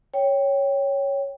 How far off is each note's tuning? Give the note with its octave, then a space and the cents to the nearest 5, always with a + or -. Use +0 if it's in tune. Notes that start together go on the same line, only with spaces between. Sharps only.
C#5 +0 G5 +0